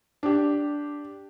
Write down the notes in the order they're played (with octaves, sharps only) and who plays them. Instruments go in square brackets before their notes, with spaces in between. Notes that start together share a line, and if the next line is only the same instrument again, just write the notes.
[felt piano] D4 G4